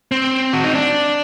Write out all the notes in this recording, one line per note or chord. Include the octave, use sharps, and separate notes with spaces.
C4
F#4
D#4
D4